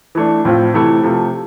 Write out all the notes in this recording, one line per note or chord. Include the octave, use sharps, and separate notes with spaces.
E3 A3 D4
A2 F3 C4 F4
C3 E3 A3 E4
C3 F3 A3